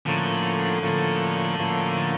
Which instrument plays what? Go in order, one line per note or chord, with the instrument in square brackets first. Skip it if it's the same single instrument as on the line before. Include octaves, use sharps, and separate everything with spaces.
[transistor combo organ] A2 F3 A#3 C#4 [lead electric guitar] D3
[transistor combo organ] A2 F3 A#3 C#4
A2 F3 A#3 C#4